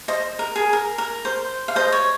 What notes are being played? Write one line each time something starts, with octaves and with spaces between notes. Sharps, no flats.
C5 D#5
A#4
G#4
A#4
A#4
C5
F5
C5 D#5
C#5